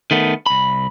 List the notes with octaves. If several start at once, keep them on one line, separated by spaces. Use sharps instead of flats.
D#3 A3 B3
C2 B5